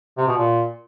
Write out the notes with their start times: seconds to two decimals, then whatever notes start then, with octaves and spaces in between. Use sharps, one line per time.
0.18 C3
0.27 B2
0.37 A#2